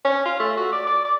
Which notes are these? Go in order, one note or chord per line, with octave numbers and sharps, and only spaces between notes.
C#4
F4
A3
F#4
D5
D5
D5